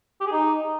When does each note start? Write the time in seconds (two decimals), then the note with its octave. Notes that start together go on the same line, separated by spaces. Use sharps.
0.21 G4
0.26 G#4
0.32 D#4